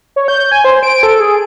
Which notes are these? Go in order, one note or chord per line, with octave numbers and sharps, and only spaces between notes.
C#5
G6
G#5
C5
D7
A4
G#4